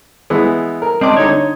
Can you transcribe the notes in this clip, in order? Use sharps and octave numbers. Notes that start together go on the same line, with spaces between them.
E3 G#3 B3
A#4
G#3 C4 D4 D#5 D6
D3 D#4 C#5